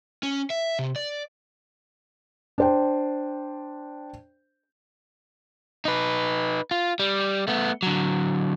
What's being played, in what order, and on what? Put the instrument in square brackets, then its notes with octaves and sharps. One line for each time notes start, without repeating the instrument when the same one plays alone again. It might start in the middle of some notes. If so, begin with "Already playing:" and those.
[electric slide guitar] C#4
E5
C3
D5
[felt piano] D4 C5 G5
[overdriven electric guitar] D#4 B4
F4
G3
A3 B3
D3 F#3